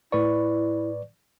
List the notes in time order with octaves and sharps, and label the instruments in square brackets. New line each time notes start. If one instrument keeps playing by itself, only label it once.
[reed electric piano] A2 B4 C#6 [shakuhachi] E4 [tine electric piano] D5